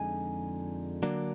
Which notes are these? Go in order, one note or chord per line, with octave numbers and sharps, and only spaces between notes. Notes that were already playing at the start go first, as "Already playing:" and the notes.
Already playing: F2 D3 G#3 D#4 G#5
D3 F#3 A#3 D4